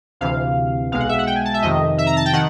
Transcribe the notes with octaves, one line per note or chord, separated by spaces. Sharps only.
D2 C3 E3 F5
B1 B2 G#3 F5
F#5
E5
F#5
G5
G#5
A5
E5
F2 C3 D#3 D#5
E5
A#5
A5
G5
D#3 F#5